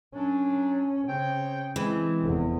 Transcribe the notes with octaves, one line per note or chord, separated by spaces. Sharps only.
F#2 F#3 C#4 D4
C#3 C4 C#5 G5
E3 G#3 C4
F1 E2